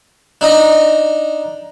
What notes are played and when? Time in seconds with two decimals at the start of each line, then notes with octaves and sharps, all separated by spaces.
0.41 D4 D#4 D#5